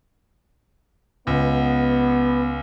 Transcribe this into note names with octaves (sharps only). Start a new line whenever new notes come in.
C#2 B3